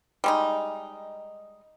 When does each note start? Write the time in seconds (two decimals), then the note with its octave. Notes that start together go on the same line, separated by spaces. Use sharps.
0.24 G3 G#3 D#4